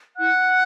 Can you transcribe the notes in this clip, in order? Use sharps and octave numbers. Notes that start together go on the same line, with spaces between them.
E4 F#5 F#6